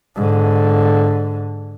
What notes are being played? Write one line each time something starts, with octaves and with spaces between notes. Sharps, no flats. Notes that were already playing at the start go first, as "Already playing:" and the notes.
G#2 D3